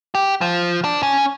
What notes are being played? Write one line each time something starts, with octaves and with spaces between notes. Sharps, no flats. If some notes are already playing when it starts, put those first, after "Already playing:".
G4
F3
D4
C#4